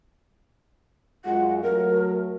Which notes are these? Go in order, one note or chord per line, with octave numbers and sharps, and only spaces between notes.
F#2 G#3 F4 F#5
F#3 A3 A#4